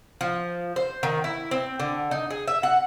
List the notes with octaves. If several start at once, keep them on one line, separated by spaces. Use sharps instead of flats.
F3
C5
D#3
E4
C4
D3
D#4
G#4
E5
F#5